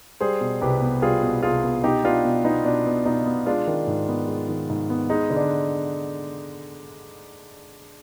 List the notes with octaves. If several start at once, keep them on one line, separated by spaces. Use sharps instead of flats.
G3 G#4 C5
B2
C2 G4 B4
B3
G3 F4 G#4
B2
C2 F4 G#4
B3
B2 D#4 G4
B3 D4 F4
B2
B3 D#4
B2 D4
B3
B2 D#4
B3
G#3 D4 F4
D#3
G#2
B3
G#3
D#3
G#2
B3
G#3 D#4
D3
D4